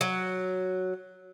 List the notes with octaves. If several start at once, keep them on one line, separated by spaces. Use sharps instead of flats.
F#3